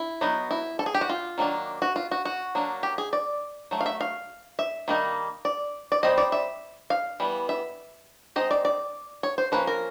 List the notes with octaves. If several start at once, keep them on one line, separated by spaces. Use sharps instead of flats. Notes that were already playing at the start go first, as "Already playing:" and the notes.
Already playing: E4
F#3 B3 D#4
E4
A4
G#4
G4
F#4
F4
D#3 F#3 A#3 D4
F#4
F4
F#4
F#4
F#3 A#3 D4
G4
G#4
D5
F#3 A3
F5
E5
F5
E5
D#3 G3 A#3 D#4
D5
D5
G3 C4 D#4 D#5
D5
E5
F5
E3 G3 B3
E5
G#3 C4 D#4 D#5
D5
D5
C#5
C5
F3 A#3 C#4 B4
A#4